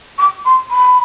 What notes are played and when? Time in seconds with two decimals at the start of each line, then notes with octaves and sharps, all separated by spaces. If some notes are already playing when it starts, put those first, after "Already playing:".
0.18 D6
0.45 C6
0.71 B5